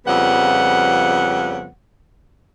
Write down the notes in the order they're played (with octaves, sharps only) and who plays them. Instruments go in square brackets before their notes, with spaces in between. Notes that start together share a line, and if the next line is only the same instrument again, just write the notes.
[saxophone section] F2 C#3 F3 G3 B3 F#5